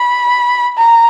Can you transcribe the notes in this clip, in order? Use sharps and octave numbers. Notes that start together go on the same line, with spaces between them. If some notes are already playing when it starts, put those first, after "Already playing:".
Already playing: B5
A#5